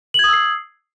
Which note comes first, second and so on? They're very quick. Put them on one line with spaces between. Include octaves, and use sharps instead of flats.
F#7 G#6 D#6 E6 C7